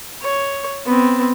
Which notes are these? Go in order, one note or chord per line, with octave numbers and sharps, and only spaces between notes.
C#5
B3 C4